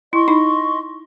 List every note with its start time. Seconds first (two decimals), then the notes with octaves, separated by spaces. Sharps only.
0.13 E4 D#5 C6 C#6
0.28 D#4